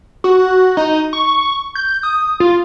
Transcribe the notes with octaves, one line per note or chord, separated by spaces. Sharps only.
F#4
D#4
C#6
G6
D#6
F4